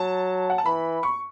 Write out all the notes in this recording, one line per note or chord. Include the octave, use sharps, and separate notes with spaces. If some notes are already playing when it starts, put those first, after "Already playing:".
Already playing: F#3 A5
F#5
A5
E3 B5
C#6